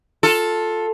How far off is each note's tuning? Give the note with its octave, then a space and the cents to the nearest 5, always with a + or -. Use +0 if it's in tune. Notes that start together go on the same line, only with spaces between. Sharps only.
F4 +15 A4 +0